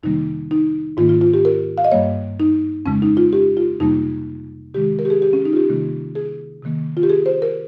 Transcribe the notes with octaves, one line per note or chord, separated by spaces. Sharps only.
F2 C3 D#3 G3 A#3 D#4
D#4
G#2 D#3 A#3 F4
F4
F4
G4
A#4
F5
D#5
G2 G3 A#3 C#5
D#4
F2 C#3 G#3 C#4
D#4
F4
G4
F4
F2 C3 G3 A#3 D#4
C3 D#3 G#3 G4
A#4
G4
G#4
G4
C#4
D#4
F4
G4
C3 D#3 G3 A#3
G#4
C3 D#3 A#3
F4
G4
G#4
C5
A#4